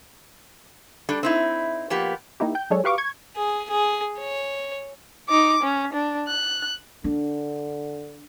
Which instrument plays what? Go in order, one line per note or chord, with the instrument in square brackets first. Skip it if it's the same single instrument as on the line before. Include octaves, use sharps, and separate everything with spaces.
[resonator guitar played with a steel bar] G3 D4 A4
C4 D#4 E4
F3 A#3 B3 G4
[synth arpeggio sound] A#3 D#4 E4 G4
G5 G6
F#3 G#3 D4 G#4 A4 C#5
F#4 G4 B4 F5 C#6 D6
C#6 G#6
[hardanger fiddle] G#4
G#4
C#5
[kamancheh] D#4 D6
C#4
D4
F#6
[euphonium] D3 [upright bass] D4